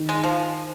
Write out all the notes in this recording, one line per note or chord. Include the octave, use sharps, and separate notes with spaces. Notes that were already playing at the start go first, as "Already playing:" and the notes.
Already playing: D#3
G#3
F3